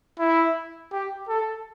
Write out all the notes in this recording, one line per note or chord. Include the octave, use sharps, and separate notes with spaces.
E4
G4
A4